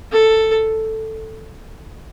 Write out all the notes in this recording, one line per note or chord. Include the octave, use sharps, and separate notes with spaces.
A4